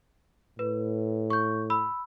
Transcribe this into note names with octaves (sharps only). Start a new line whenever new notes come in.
A2 B4
C#6 G6
B5 E6